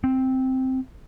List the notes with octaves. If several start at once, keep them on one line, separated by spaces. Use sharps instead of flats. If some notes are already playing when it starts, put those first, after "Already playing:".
C4